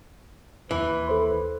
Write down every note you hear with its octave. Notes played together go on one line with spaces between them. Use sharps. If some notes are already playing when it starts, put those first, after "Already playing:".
D#2 E3 B4
A4 C5 C6